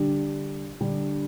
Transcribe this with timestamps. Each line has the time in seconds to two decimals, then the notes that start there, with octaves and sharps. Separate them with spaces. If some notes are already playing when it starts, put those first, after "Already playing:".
Already playing: D3 G3 D4 G4
0.81 D3 G3 D4 G4